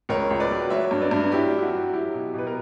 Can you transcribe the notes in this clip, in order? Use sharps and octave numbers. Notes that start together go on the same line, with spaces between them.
C#2 A#4 C#5
C#2
B4 D5
F#3
F#3 C#5 E5
G2
B4 D5
G2
F#3 E4 G4
F#3
E4
F#4
F#3
F#3 E4 G4
B2
B2 B4
A#4